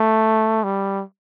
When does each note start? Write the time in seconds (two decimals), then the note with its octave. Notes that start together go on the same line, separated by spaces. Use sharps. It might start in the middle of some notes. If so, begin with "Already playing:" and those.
Already playing: A3
0.64 G3